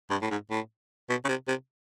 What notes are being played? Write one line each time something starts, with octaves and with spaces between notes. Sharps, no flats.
G2
A2
G#2
A2
B2
C#3
C3
C3